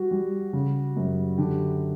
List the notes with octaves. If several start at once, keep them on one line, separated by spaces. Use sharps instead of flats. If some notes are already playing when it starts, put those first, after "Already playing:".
Already playing: G3 F#4
G3
C#3
F#2
D3 G4